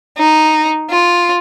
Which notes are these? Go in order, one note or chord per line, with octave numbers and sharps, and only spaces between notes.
D#4
F4